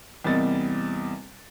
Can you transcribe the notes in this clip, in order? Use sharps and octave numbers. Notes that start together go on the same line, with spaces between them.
E2 C3 G3 A#3 D#5 A6